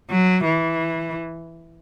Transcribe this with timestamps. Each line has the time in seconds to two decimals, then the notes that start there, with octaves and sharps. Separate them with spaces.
0.11 F#3
0.44 E3